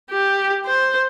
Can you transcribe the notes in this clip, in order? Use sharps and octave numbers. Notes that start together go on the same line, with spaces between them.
G4
C5